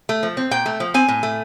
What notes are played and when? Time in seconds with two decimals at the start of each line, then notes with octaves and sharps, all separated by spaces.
0.09 A3
0.23 F3
0.37 C4
0.51 A#2 G5
0.66 A3
0.80 F3
0.94 C4 G#5
1.08 A2
1.23 A3